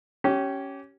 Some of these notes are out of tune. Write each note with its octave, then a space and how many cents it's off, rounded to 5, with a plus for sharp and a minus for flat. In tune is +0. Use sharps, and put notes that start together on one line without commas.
C#4 +0 G4 -25